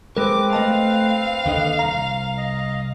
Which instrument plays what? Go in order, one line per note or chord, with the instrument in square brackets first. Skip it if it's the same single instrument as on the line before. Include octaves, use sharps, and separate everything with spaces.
[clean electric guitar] G#3 A#4 [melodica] C4 B4 [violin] D6
[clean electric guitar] A3 D#5 A5 [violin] F5
[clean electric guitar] D#2 D3 D#5
C2 A#5
[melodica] D#5